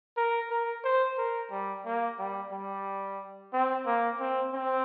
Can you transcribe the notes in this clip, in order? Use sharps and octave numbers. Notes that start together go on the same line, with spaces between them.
A#4
A#4
C5
A#4
G3
A#3
G3
G3
C4
A#3
C4
C4